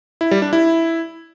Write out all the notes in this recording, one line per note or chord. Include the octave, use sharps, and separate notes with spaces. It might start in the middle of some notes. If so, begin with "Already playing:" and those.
E4
G3
D4
E4